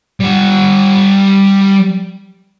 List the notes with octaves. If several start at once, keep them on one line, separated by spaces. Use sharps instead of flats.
G3 F#5